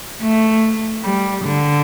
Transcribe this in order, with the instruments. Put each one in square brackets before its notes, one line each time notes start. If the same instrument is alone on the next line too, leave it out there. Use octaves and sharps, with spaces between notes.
[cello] A3
G3
D3